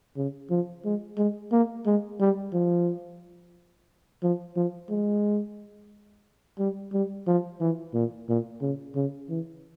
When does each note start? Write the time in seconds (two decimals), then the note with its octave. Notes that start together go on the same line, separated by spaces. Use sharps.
0.17 C#3
0.50 F3
0.85 G#3
1.18 G#3
1.52 A#3
1.86 G#3
2.20 G3
2.53 F3
4.23 F3
4.56 F3
4.90 G#3
6.59 G3
6.93 G3
7.27 F3
7.60 E3
7.94 A#2
8.29 A#2
8.62 C#3
8.95 C#3
9.30 E3